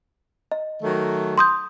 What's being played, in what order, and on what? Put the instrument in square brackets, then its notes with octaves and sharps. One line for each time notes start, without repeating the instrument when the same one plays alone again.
[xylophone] D#5
[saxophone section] D#3 F#3 A3
[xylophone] C6 D#6 G6